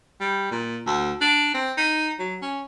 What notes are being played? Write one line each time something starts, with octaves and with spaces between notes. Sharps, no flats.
G3
A#2
D2
D4
C4
D#4
F#3
C#4